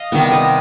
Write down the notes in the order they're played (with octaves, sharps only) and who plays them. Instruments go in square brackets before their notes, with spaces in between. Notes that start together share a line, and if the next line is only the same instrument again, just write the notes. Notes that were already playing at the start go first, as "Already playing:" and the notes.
Already playing: [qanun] D#5 F5
C3 D#3 G3 B3
D#5